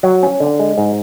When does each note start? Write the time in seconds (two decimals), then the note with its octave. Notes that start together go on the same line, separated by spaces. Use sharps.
0.03 F#3
0.23 C#4
0.40 D3
0.59 G#3
0.78 G#2